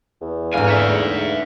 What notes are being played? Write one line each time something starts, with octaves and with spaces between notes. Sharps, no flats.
E2
D2 G#2 A4 B4 F5 G#5
C#5 E5